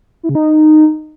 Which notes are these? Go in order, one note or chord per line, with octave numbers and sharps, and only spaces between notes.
E4
C#3
D#4